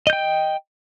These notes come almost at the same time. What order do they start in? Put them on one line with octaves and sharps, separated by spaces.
D#5 G6 G5